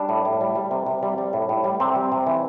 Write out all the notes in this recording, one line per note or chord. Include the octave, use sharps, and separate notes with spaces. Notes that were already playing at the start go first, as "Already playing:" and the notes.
Already playing: G3 D4
A2
A2
G3
G3
C3
C3
G3
G3
A2
A2
G3
C3 C4
G3
C3
E3